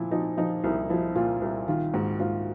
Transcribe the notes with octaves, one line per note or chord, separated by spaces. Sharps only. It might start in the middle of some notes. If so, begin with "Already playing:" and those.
Already playing: A#2 F3 E4
F3 D#4
F3 D#4
C2 E4
F3 E4
A#2 F4
C2
D#3 F4
G#2 F#4
G#2 F4